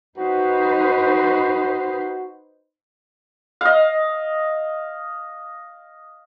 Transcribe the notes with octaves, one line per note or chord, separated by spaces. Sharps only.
D#4 F#4 B4 C5
D#5 F5